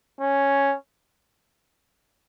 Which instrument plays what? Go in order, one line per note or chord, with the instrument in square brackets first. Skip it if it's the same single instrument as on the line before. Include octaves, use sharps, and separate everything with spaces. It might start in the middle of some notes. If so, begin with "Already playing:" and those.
[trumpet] C#4